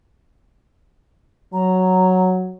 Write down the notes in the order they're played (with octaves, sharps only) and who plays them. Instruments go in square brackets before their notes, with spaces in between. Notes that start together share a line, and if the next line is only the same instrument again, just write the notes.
[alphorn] F#3 [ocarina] A#5